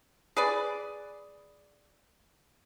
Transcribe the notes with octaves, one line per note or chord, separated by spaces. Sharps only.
G#4 B4 D5 D#6